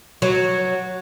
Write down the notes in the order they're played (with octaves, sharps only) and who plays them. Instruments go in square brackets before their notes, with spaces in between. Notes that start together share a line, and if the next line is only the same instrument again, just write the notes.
[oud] F#3